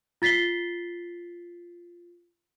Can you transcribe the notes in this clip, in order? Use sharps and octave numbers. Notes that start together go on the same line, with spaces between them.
F4 A6 B6 C7 G7